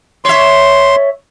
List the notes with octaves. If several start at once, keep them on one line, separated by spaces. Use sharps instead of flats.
C#5 E5 C6